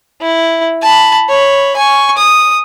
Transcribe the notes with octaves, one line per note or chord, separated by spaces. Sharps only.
E4
A5 B5
C#5 B5
G#5 C#6
D#6